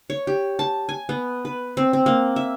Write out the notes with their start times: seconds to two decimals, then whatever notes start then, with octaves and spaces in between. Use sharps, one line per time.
0.10 C#5
0.27 G4
0.59 A5
0.89 G#5
1.09 B3
1.45 B4
1.77 C4
1.93 C4
2.06 A#3
2.36 E5